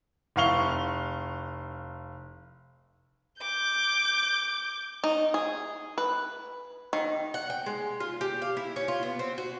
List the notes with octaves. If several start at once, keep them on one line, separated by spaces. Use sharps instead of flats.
F1 E4 F5 C#6 F7 G7
D6 G6
D#4
G#4
B4
D#3
F#5
G5
G#3
F4
G4
F5
E4
C#4
F4
B3
C4
F#4